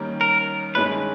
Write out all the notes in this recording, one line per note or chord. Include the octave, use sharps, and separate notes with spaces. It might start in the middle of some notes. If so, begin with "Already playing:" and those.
Already playing: D#2 D#3 G3 A#3 C#4
A#4
G2 D#3 G#3 C#4 E4 B4